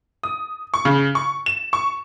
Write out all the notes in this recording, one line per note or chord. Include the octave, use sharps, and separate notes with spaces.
D#6
C#6
C#3
C#6
E7
C#6